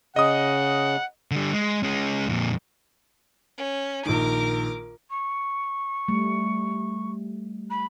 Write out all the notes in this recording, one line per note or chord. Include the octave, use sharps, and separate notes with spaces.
C#3 D#5 F#5 D#6
D3 G3
G#3
G#3 C#4
F2 A#2
C#4
A#1 D#3 A#4 D6
C#6
G3 A3
B5